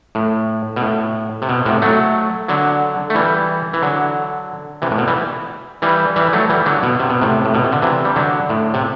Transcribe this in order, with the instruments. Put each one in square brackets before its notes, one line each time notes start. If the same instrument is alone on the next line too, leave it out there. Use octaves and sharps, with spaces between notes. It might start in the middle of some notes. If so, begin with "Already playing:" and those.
[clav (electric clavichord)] A2
B2
A2
C3
B2
A2 C3
F#3 A3
D3 F#3
A3
E3 G3
E3
D3 F#3
C3 E3
A2
B2
E3 G3
E3 G3
E3 G3
F#3 A3
E3 G3
D3 F#3
B2
C3
B2
A2 C3
A2
B2
C3
D3
C3 E3
G3
D3 F#3
A2
C3